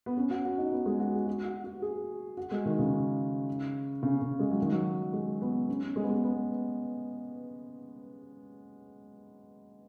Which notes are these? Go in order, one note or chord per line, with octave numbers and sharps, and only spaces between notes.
B3
C#4
F#4
F#4
D#4
B3
G#3
F#4
G#4
F#4
F#4
F#4
G#4
F#4
G#3
D#3
C#3
C#3
C#3
G#3
F#3
D#3
F#3
G#3
B3
C#4
G#3
B3
G#3
B3